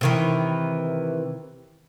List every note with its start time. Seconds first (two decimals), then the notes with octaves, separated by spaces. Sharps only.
0.01 C3 D#3 E3